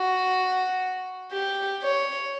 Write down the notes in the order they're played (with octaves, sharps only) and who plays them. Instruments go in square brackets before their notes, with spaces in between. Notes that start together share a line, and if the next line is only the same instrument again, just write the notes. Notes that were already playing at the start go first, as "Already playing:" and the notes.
Already playing: [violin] F#4
G4
C#5